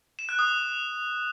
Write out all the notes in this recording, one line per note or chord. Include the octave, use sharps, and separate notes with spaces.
E7
F#6
D#6